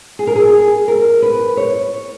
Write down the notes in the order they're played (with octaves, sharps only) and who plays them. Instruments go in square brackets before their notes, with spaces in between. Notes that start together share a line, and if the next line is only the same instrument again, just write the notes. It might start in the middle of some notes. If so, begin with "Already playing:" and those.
[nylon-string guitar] G#4
A#4
G#4
A#4
B4
C#5